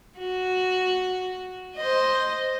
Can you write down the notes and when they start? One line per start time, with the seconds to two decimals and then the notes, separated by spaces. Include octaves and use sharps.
0.19 F#4
1.77 C5 D#5